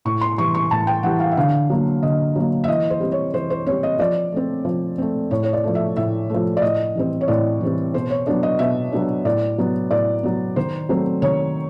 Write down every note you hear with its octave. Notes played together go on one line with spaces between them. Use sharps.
A2 C#6
C6
E3 G3 C#6
C#6
A2 A5
G5
E3 G3 F#5
F5
E5
D3 F5
F#3 A#3
D3 D#5
F#3 A#3
E5
E3 D#5
C5
G3 C4
C#5
E3 C5
C5
G3 C4 C#5
D#5
F3 D5
A3 C4
F3
A3 C4
A2 C#5
C#5
D5
F3 A3
E5
A2 E5
F3 A3
D5
A2 D#5
E3 G3 C4
C#5
A2 D5
E3 G3 C4
B2 C5
C#5
F#3 B3 D4 D5
D#5
B2 E5
F#3 B3 D4
A2 D5
F#3 B3
A2 D5
F#3 B3
D#3 C5
F#3 A3 C4
D#3 C#5